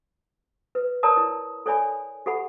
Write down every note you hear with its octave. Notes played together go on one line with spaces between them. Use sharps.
B4
A#4 C#5 D5 A5 A#5 D#6
E4
A4 C#5 D5 G#5 B5
G4 A4 F#5 B5